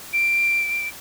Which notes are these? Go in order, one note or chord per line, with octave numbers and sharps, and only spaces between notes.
D7